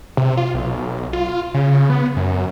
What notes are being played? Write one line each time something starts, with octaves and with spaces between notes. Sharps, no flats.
C3
F4
B1
F4
C#3
B3
F#2